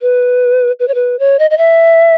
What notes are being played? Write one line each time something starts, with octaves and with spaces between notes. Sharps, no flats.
B4
B4
C#5
B4
C#5
D#5
D#5
E5